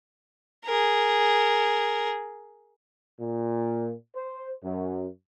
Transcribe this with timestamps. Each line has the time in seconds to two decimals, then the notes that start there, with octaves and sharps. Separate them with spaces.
0.65 G#4 A#4
3.20 A#2
4.16 C5
4.64 F#2